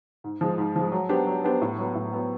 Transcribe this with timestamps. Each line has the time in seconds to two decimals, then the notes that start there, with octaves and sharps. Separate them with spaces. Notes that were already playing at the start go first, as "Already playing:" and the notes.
0.24 G#2
0.41 F3 G#3
0.58 G#2
0.76 F3 G#3
0.92 F#3
1.09 B3 D4 G4 C5
1.27 F#3
1.44 B3 D4 G4 C5
1.62 A2
1.79 F#3 B3
1.95 A2
2.13 F#3 B3